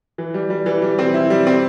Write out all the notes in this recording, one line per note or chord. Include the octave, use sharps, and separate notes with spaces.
E3
G3
G3
E3
G3
C4
E4
G3
C4